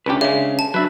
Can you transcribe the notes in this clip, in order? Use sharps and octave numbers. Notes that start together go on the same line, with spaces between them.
C#2 C#4 D4 G4 B4
C#3 G#3 E5
A5
F#3 D4 B4 E5